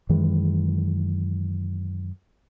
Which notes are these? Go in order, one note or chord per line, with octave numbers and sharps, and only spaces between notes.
F#2 D#3 E3 G#3